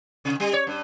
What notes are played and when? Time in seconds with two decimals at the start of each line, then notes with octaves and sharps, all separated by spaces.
0.25 C3
0.40 G3
0.53 C#5
0.67 G2